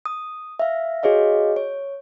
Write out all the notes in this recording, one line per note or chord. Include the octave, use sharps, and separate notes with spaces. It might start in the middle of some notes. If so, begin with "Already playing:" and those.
D#6
E5 F5
F#4 G#4 C#5 D#5 F5
C#5